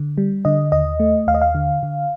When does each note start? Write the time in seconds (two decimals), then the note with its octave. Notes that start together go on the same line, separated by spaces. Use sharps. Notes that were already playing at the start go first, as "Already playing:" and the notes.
Already playing: D3
0.18 G3
0.45 D3 D#5
0.72 D#2 D#5
1.00 A3
1.27 D#2 F5
1.34 D#5
1.41 F5
1.55 D3
1.83 D3